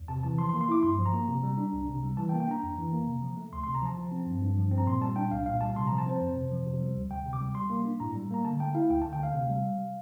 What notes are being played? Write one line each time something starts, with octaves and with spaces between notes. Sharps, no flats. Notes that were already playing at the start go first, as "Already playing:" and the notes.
Already playing: E2
C3 A5
E3 A5
F3 C6
C6
A#3
C6
E4 D6
G2 C6
F3
A#5
A#3
C3
G3
D4
C2
C3
G3
E3 A5
G5
A#3
G5
D4 A#5
F2
E3
A#3
C3
F3
A3
D2 C6
C3 C6
A#5
F3 A5
F3
C4
G2
G2
F3
C4
A#5
A#2 C6
G3 A5
D4 G5
C2 F5
A#2 F5
G3 A5
C3 C6
F3 A#5
A5
C4 C5
F2
C3
F3
C3
G3
D2
D2 G5
C3
D6
G3
G3 C6
A#3
D4
A2 A#5
G3
A#3 A#5
D3 A5
A3 G5
E4 F5
D2 G5
D3 A5
G5
A3 F5
C3
G3